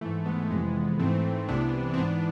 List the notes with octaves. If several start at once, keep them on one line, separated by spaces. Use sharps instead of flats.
G#2 E3 A3
G#3 B3
F2 C3 E3 G#3 B3
G#2 E3 A3 C4
C2 C3 E3 B3 D4
C4
G#2 E3 B3 D4